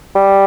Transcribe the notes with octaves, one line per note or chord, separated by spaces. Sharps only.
G3